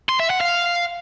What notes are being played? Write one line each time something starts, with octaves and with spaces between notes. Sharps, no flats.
C6
E5
F#5
F5